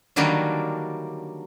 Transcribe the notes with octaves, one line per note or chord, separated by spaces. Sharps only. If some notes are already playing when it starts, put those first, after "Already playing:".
D3 D#3 F#3 G3 A#3 D4